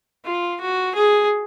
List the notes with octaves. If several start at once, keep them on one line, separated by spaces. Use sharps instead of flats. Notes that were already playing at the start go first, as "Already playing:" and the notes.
F4
F#4
G#4